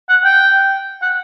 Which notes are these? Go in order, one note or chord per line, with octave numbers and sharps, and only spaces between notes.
F#5
G5
F#5